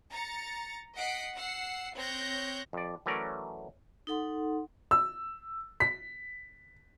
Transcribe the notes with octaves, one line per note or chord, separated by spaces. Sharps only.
A#5 A6 C#7
D#5 F#5 B6 C7 D7
F#5 E6 C7
C4 C#5 F#6 G6 A#6
F2 D5
E3 F#3 A3 C#4 A#4 D5
D#4 A4 F#5 C6
E6
B6